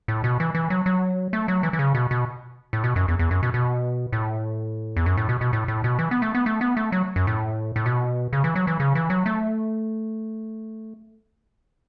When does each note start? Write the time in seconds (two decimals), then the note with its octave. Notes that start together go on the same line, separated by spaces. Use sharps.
0.08 A2
0.24 B2
0.40 E3
0.55 E3
0.70 F#3
0.86 F#3
1.33 A3
1.48 F#3
1.63 E3
1.73 E3
1.79 C#3
1.95 B2
2.11 B2
2.73 A2
2.84 B2
2.96 F#2
3.08 E2
3.19 E2
3.31 F#2
3.43 B2
3.54 B2
4.12 A2
4.96 E2
5.06 F#2
5.17 A2
5.29 B2
5.41 B2
5.53 A2
5.68 A2
5.84 B2
5.99 E3
6.11 B3
6.22 A3
6.35 B3
6.46 A3
6.61 B3
6.77 A3
6.92 F#3
7.16 F#2
7.27 A2
7.76 A2
7.86 B2
8.33 C#3
8.44 E3
8.56 F#3
8.67 E3
8.80 C#3
8.95 E3
9.10 F#3
9.26 A3